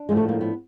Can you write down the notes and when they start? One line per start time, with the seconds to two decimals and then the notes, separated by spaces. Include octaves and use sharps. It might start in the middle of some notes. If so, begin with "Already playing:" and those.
Already playing: D4
0.09 A2 F3 G#3
0.17 A3
0.29 A#3
0.41 B3